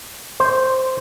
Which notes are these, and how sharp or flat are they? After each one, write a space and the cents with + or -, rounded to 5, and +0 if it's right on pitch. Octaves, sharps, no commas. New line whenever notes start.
C5 -5